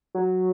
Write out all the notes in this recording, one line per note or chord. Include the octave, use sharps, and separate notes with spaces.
F#3